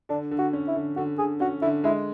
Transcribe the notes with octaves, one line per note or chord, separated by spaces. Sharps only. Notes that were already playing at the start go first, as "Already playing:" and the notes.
D3 D4
D3
F#4
C#4
E4
D3
D3 F#4
D3 G#4
C#4 F#4
D3 E4
G#3 E4